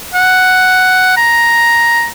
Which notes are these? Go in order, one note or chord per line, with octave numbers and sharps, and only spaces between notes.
F#5
A#5